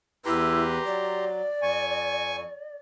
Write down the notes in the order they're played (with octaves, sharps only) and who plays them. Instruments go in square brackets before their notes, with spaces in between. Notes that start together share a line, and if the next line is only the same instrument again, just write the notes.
[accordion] E2 B4 [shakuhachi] E4 [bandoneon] G4 A#5 C6
[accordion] F#3 [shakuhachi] D5
[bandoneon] F2 [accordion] G#5 C#6